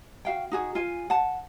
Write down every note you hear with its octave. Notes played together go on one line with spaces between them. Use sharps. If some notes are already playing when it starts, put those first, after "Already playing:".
F#4 F5 G5
D#4 F#4 G#4
F4 G#5
F#5 A5